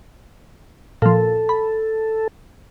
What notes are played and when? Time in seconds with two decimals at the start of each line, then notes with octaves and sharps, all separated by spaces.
1.02 A#2 F3 A4
1.49 B5